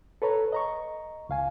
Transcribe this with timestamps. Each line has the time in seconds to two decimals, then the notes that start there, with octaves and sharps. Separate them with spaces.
0.22 A4 B4 C#5 A#5
0.52 D#5 A#5 C#6
1.29 C#2 F5 G#5